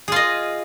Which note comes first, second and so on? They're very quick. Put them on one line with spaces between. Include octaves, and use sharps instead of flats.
G#4 F4 D#5